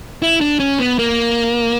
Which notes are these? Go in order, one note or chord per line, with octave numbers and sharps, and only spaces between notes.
E4
D4
C#4
B3
A#3